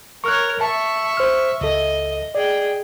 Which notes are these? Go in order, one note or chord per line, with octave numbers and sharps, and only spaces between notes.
A#4 C#5 C#6 F6 F#6
E5 A5 C#6
C5 F6
C#2 A4 D#5
G#4 D5 G5